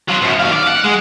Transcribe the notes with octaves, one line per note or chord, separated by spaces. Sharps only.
F#3 F4
F#2 B2
D#2 F5
D5
F#5
G#3